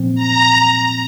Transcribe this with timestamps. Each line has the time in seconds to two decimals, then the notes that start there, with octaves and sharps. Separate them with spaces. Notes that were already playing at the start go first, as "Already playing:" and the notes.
Already playing: A#2 F3 C4
0.15 A#5